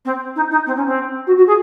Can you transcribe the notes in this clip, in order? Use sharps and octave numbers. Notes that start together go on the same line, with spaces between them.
C4
D#4
D#4
C4
C#4
C4
F#4
F#4
G#4